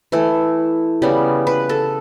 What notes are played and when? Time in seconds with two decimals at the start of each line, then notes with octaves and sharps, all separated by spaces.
0.12 E3 A3 E4
1.02 C#3 G3 B3
1.47 B4
1.69 A4